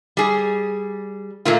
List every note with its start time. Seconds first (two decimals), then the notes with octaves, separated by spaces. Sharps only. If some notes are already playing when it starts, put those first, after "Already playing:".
0.17 G3 G#4
1.45 A#2 A3 A#3 F4